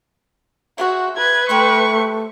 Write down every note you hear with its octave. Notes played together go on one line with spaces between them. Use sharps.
F#4 G#4 C5 E5
B4 G#6
A3 G4 C5 E5 C#6